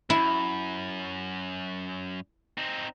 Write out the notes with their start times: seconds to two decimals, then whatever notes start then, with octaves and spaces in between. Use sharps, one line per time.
0.10 F#2 E4
2.58 C4 D#4